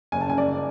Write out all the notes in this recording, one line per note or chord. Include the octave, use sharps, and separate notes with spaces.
F#1 G#5
A5
F#1 G#5
D5